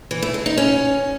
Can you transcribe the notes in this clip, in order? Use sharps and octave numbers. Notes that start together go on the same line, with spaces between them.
E3
A3
G#3
D#4
C#4